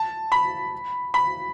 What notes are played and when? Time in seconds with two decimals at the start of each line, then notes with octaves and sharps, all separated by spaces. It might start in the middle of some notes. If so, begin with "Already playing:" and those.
Already playing: A5
0.32 B5
1.14 B5